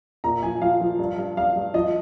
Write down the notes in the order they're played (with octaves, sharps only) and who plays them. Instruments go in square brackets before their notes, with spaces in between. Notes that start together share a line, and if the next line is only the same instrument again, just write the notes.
[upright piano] A#2 A#5
F3 G#5
F3 F5
F3
G2
G2
G2 F5
G2
F3 D#5